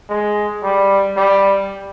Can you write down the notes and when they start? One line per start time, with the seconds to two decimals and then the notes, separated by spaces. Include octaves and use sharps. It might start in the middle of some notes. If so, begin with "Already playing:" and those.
0.09 G#3
0.63 G3
1.16 G3